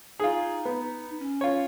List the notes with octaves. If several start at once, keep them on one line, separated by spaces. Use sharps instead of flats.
D#4 F4 G#4
B3
C#4
F4 C#5